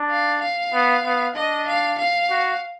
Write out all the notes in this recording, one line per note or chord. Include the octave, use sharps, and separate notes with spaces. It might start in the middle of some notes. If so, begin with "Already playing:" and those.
Already playing: D4
F5
F5
B3
B3
D4 D#5
F5
F5
F#4